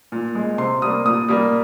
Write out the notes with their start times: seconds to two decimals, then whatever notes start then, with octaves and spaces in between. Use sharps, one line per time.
0.12 A#2
0.35 G#3
0.58 C3 C6
0.82 G3 A#3 D#6
1.05 A#2 D#6
1.28 G3 A#3